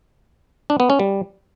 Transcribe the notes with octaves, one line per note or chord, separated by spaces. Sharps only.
D4
B3
C#4
G3